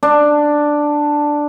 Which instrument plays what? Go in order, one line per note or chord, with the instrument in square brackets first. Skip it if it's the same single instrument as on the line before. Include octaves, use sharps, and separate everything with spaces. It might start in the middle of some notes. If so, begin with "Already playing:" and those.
[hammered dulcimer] D4